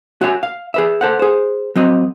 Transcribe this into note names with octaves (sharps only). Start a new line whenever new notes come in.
F#4 C#5 E5 F5 G#5
F5
G#4 B4 E5
A4 C5 F#5
G#4 C5
F#3 C4 D#5